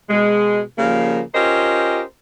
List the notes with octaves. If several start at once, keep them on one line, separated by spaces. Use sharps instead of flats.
B2 G#3
C#3 F3 G3 A#3
C#4 F4 G4 A#4 C5 D#5